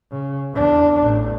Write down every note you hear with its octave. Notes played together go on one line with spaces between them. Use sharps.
C#3
E2 D4
A1